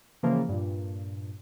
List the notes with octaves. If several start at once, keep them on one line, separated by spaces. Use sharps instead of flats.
C#3 E3 F3 A#3
G2 A#2